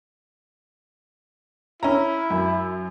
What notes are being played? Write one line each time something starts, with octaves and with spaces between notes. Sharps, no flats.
C#4 E4 A#5
F#2